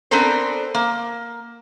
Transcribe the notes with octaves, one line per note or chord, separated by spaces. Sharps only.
B3 C4 D4 A4 A#4 C5
A#3